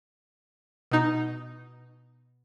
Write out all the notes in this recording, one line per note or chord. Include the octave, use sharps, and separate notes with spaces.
B2 D#4